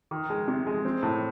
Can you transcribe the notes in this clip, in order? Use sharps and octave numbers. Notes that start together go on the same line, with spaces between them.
D#3
G#3
C3
G#3
C4
A2